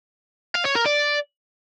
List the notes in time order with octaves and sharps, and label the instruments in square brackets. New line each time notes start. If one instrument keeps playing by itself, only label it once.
[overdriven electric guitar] F5
C#5
A#4
D5